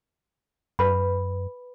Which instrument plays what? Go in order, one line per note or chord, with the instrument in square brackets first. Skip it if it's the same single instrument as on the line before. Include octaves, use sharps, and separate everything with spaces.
[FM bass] F#2 [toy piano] B4 B5